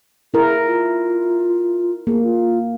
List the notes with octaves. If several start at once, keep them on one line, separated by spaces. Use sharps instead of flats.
E4 G#4 A#4
F4
A#3 G#4
F4